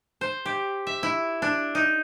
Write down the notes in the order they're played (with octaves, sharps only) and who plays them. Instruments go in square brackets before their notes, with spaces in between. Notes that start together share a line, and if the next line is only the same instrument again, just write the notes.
[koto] C5
G4
E5
E4
D4
D#4